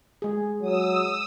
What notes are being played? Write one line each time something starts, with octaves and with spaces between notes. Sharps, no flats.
G#3 G#4
F#3 D#6 E6